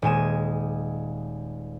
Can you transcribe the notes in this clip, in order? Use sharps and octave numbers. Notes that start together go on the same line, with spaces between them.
D#1 G#3 G#5 E7